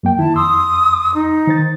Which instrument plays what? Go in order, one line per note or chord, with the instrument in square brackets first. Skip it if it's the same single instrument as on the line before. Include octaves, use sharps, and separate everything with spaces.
[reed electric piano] F#2 A#3 G5
[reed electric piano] D#3 E4 [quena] A5
[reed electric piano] F2 C6 E6 [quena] D#6
[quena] D#4
[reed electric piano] D#3 C5 A6